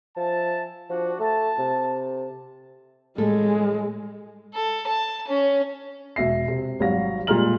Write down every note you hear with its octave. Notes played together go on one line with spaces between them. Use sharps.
F3 E5 G#5 A5
F3 D4 F#4
A3 A5
C3
A2 G3 G#3 A4
A4
A5
C#4
E1 B2 E5 A#6 C7
C3
G#1 F#3 G3 F#4 F5 A#6
A#2 G3 G#3 A#5 F6 F#7